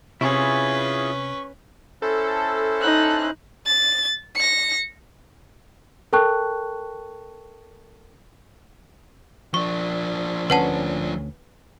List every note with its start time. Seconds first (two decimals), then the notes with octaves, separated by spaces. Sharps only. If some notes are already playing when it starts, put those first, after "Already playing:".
0.21 C3 C#4 E4 F4 G#4 B4 C#6
2.02 C#4 E4 A4 C5
2.81 D#4 F#6
3.66 A6
4.36 A#6 C#7
6.13 A4 A#4 G5 A5 C#6 F#6
9.54 F3 D4 C#6
10.50 D2 C#4 B4 F#5 A5